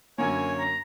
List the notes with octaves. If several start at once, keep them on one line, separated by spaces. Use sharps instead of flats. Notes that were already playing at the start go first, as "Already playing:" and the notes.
F#2 D3 A#3 C#5 G#5
A#5